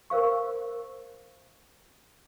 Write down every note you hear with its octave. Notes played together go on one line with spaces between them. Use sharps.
A#4 C5 F5 C#6